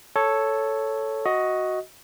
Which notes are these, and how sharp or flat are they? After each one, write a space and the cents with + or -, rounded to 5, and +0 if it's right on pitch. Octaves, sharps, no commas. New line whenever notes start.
A4 +0 C#5 +0
F#4 +0 D#5 +15